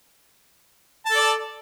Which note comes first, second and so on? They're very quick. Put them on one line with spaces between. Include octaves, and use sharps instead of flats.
A5 A4 D5